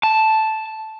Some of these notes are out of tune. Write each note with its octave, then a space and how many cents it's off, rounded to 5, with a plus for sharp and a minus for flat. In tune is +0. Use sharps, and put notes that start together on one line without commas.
A5 -5